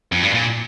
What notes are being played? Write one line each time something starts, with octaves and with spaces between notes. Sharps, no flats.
F2
G2
A#2